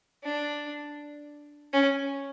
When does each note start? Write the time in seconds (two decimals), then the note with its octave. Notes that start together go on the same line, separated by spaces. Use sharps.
0.23 D4
1.73 C#4